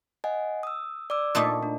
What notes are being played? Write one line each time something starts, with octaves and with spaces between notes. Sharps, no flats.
D#5 F#5 G#5
D#6 E6
D5 D6 E6
A#2 A3 D#4
D4